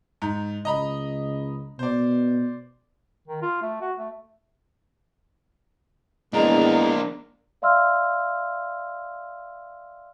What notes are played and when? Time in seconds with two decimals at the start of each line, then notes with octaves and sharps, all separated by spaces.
0.22 G#2
0.65 C#2 D#5 A#5 B5
1.79 B2 C5 D5
3.28 D#3
3.42 F4
3.62 A3
3.81 F#4
3.99 A3
6.34 E2 G#3 A#3 D4 A#5
7.62 D5 E5 F5 C6 E6 F6